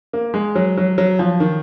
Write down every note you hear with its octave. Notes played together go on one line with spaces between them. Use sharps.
A#3
G#3
F#3
F#3
F#3
F3
D#3